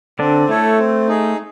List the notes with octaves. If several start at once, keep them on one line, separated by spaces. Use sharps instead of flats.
D3 C4 D4
A3 E4 A4 C#5
C4
D#4 G#4